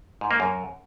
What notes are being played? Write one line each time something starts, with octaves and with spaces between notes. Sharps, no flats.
G#2
A#3
F#2